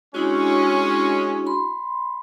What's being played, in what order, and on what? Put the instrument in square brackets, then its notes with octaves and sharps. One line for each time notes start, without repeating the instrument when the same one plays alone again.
[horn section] G#3 C#4 [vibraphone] D4 E4 F#4
[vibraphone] B5 C6